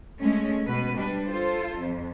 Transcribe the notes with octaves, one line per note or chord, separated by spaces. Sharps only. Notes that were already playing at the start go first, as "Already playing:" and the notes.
G#3 A3 C#4
B2 B4
G3 D4 B4
F4 A4 C5
F2